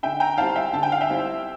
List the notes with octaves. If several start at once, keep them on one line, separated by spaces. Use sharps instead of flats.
D3 E5 G5
G5 A#5
G3 C4 E4 F5 A5
E5 G5
D3 A5
G5
F5
E5 G5
G3 C4 E4